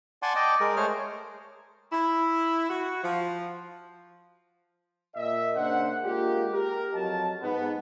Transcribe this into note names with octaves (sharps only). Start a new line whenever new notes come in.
D5 F#5 G#5 A5 C6 D6
D5 D#5 G5 A5 D6
G#3 G#4 A#4
A3 G#4 C5 C#5 F6
E4
F#4
F3
A#2 D#5 E5
C#3 A#3 D4 C5 F#5
G#3 A#3 F4 G4
G4 A#4
F2 F#3 D#5 A5
G#2 B3